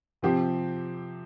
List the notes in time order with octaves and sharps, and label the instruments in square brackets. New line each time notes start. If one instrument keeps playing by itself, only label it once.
[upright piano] C3 F3 C4 G4